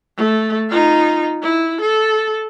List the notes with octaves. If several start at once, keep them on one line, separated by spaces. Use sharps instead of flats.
A3
D#4 F4
E4
A4